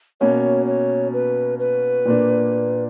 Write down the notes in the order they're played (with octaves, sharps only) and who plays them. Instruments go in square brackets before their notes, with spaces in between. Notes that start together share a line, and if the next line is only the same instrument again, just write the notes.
[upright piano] B2 A#3 C#4 F#4 [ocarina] C#5
[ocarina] C#5
B4
B4
[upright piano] A#2 A#3 D4